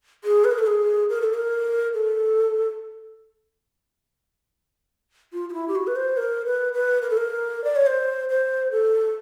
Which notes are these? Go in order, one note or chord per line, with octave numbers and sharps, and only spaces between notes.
G#4
B4
A#4
A4
G#4
A#4
A4
A#4
A4
F4
F4
E4
G4
F#4
B4
C5
A#4
B4
B4
A#4
A4
A#4
D5
C#5
C5
C5
A4